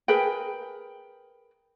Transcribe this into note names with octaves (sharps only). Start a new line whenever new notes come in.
G#4 A#4 B4 G5